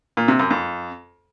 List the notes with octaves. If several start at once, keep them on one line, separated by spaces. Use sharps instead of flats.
A#2
C3
F#2
F2